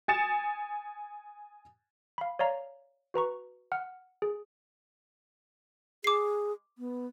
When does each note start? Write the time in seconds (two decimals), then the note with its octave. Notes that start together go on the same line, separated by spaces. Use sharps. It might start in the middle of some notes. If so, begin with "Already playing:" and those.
0.08 G#5 D#6 A6 C#7 E7
2.18 F5 B5
2.39 C#5 D5 F5 A#5
3.14 F#4 B4 A#5 C#6
3.72 F#5 F6
4.22 G#4
6.04 G#4 D6 C7
6.78 B3